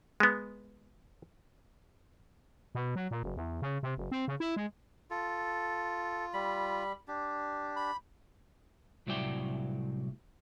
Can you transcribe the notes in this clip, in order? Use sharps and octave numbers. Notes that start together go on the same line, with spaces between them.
G#3 B3
B2
F#3
A#2
F#1
E2
C#3
C3
F#1
C4
C#3
E4
G#3
F4 A4
G3 B5
D4 G4
B5
C2 A2 F#3 E4 D5 G5